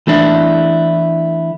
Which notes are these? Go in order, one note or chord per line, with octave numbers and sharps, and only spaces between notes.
E3 A3 B3 D4 E4